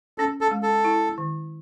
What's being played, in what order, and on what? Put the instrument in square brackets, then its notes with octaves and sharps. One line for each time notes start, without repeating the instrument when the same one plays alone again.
[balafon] C#4 [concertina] A4
[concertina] A4
[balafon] G#3
[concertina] A4
[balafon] E4
D#3